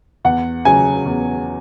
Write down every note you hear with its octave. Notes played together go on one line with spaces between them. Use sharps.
E2 F#5
C#3 F#3 G#5
E2